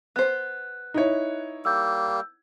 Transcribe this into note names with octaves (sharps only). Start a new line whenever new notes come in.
B3 C5 F#6
D#4 E4 C#5
G3 A#3 E6 G6